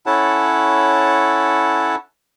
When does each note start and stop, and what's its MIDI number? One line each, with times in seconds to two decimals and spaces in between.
0.06 1.96 61
0.06 1.96 64
0.06 1.96 69
0.06 1.96 73
0.06 1.96 78
0.06 1.96 81